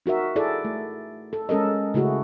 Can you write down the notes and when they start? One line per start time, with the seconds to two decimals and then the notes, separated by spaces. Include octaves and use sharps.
0.06 D#4 F#4 A#4 E5
0.36 E4 G#4 A4 D5
0.65 A3
1.33 A4
1.49 G#3 C#4 A4 A#4 D#5
1.94 C#3 A3 E4 F#4 G#4